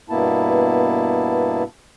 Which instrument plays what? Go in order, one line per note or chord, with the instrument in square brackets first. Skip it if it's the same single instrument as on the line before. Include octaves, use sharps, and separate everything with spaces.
[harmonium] G2 B2 A#3 B3 E4 A5